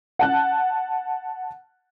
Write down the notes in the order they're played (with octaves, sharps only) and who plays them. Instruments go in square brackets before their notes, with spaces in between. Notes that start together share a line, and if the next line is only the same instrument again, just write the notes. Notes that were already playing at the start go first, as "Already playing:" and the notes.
[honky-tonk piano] F#5 A5 F#6